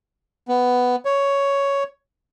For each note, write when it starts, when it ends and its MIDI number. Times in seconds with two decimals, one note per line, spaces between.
0.48 0.96 59
1.05 1.83 73